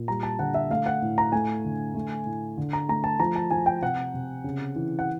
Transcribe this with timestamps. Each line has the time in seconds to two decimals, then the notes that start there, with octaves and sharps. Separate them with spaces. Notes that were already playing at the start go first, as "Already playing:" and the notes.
Already playing: A#2
0.08 G3 A#5
0.23 A5
0.39 D3 F#5
0.54 E5
0.70 A3 F5
0.86 F#5
1.02 A2
1.18 A#5
1.32 A3 G#5
1.65 D3
1.95 A3
2.26 A2
2.57 D3
2.73 A#5
2.89 A3 A#5
3.04 A5
3.20 F3 A#5
3.36 A5
3.51 F3 G#5
3.66 G5
3.82 C3 F#5
4.14 C3
4.44 C#3
4.76 E3
4.99 F#5